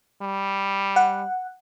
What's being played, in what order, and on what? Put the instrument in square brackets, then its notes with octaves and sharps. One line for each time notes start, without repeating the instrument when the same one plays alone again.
[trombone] G3
[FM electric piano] F#5